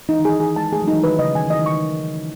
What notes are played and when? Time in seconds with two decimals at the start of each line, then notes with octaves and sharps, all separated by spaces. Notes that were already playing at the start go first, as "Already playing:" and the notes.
0.09 E3 D#4
0.19 D#3
0.25 E3 G#4
0.40 E3 G#4
0.56 G#3 A5
0.72 A3 G#4
0.82 F#3
0.87 D#4
0.93 E3
1.03 D#3 B4
1.18 C#3 D#5
1.35 D#3 G#5
1.45 E3
1.50 D#3 D#5
1.66 D#3 C#6